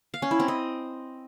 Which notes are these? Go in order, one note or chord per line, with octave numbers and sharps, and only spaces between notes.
F5
C#4
E4
C4
D#5